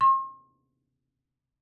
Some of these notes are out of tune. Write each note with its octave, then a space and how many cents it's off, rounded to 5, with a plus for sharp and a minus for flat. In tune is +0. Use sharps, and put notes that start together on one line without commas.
C6 +45